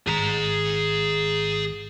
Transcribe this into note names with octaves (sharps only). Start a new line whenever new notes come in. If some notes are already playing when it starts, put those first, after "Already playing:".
G#1 G#4 A#5